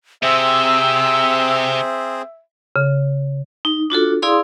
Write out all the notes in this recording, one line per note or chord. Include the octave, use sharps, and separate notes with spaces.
C3 C4 G#4 C5 E5 E6
C#3
D#4
D4 F4 F#4 A4
E4 G#4 D5 F5 C6 D#6